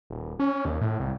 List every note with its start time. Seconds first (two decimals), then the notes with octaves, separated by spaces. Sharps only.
0.10 D#1
0.39 C#4
0.65 D#2
0.81 A2
1.00 C2